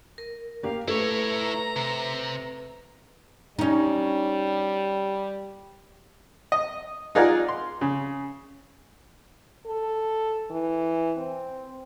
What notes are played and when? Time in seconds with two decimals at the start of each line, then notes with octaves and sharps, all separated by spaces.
0.18 A#4
0.63 A#3 G4 F5
0.88 A3 E4 B4 C#5 A#5
1.76 C3
3.59 G3 C#4 D#4
6.52 D#5
7.15 D#4 F4 G#4 D5 F#5 A#5
7.48 C6
7.81 C#3
9.66 A4
10.51 E3
11.17 C4